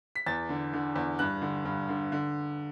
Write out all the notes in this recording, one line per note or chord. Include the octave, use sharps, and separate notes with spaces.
B6
E2 A6
D3
D3
E2
G2 F#6
D3
G2
D3
D3